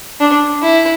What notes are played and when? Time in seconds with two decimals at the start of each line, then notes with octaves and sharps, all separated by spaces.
0.20 D4
0.62 E4